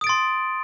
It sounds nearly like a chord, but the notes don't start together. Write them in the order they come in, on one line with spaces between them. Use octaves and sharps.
D#6 D7 A6 C6